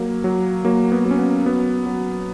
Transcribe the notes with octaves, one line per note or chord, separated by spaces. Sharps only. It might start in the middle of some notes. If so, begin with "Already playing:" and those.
Already playing: F#3 A#3
F#3
F#3 A#3
B3
F#3
C#4
B3
F#3 B3
F#3